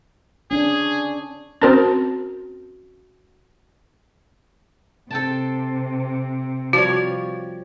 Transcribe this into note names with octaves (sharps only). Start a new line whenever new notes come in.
C#4 D4 G#4
C4 C#4 F#4 A#4 A5
C3 A4 G5 A5
F3 G3 F#4 C#5